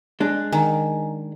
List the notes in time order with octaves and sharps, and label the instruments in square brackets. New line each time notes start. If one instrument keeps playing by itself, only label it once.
[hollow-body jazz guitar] G#3 D4 [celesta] F#6
[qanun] D#3 [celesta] G#5 A#5